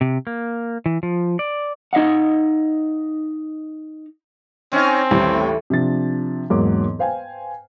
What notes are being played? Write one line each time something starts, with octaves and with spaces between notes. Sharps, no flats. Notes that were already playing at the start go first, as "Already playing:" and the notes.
C3
A#3
E3
F3
D5
D#4 D#5 F5 F#5
C4 C#4 D#4
A1 D#2 A2 G3
C3 F3 D4 A6
E1 G#2 F#3 A#3 C#5 D6
B4 C5 F5 G5 G#5